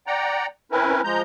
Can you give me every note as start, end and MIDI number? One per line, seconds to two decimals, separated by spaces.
0.07 0.46 74
0.07 0.46 78
0.07 0.46 79
0.07 0.46 82
0.72 1.01 60
0.72 1.01 61
0.72 1.01 64
0.72 1.01 70
0.72 1.01 71
1.04 1.22 53
1.04 1.22 56
1.04 1.22 82
1.04 1.22 91